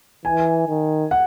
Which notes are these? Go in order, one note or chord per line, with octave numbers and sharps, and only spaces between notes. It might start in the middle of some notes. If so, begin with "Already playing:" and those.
E3 G#5
D#3
F#5